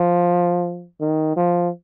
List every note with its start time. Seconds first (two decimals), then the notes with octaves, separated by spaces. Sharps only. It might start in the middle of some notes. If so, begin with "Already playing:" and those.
Already playing: F3
1.00 D#3
1.36 F3